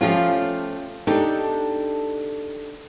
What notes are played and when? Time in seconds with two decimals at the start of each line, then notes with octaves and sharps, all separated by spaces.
0.01 F3 A3 C#4 F4 G4
1.07 D4 D#4 G4 A4